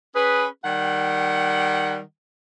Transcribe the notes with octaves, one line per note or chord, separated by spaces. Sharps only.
C#4 G#4 B4
D#3 G3 F#5